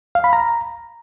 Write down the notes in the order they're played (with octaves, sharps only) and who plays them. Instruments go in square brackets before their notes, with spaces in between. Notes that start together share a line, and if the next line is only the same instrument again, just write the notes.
[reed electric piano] F5
B5
A#5